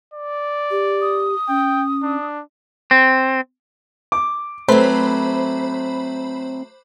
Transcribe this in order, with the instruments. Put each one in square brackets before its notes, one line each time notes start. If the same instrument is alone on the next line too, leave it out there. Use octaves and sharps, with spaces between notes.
[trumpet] D5
[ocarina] G4
[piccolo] D#6
[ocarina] C#4 [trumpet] G5
[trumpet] D4
[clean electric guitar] C4
[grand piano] D6
[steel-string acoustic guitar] F#3 A3 [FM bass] C4 [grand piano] B4 [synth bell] C5 B5